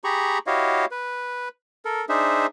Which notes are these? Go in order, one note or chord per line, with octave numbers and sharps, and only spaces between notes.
G4 G#4 A#5 B5 C#6
E4 F#4 G4 C#5 D#5 F5
B4
A4 A#4
D4 D#4 G#4 C5 E5